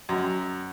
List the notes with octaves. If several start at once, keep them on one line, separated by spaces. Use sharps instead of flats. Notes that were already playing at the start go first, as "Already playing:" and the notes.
F#2